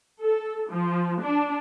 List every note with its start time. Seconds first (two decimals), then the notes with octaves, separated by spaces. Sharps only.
0.21 A4
0.70 F3
1.22 D4